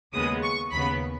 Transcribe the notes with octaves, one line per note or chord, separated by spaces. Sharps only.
D#2 C#3 G#3 B3 D#6
C#6
D#2 C#3 B3 B5